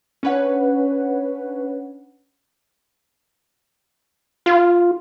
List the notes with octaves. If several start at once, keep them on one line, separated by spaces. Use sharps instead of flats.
C#4 D4 B4 C#5 F#5
F4